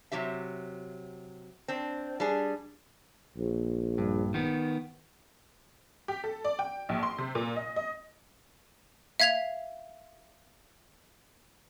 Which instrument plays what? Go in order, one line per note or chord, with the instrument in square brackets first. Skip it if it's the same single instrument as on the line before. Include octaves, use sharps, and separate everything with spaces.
[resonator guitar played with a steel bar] C3 F#3 G4 E5
C4 D4
G3 D4 G#4
[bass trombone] A#1
[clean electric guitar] G2
D#3 B3
[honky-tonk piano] G4
A4
D5
G5
A#1
C6
C3
A#2
D#5
D#5
[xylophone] E5 F5 G#6 B6 F7